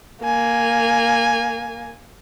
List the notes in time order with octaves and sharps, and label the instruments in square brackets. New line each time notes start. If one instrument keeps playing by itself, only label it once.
[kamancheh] A#3 G#5